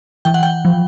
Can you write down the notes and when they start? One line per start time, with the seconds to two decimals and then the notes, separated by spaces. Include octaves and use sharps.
0.25 E3 G5
0.34 F#5
0.43 G5
0.65 F3